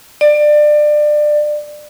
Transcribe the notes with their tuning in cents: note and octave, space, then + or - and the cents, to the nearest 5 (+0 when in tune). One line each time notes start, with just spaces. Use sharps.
D5 +25